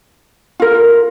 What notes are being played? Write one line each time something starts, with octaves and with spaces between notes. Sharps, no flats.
F4 A#4